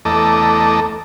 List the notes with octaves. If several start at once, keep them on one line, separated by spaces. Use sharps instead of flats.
E2 A3 A4 D#5 A#5 D6